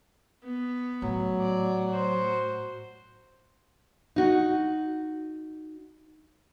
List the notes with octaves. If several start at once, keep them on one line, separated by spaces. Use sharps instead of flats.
B3
A2 F#3
D5
F#4 C5
D#4 F#4